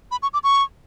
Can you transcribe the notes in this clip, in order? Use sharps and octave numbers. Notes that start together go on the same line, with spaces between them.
B5
C#6
D6
C#6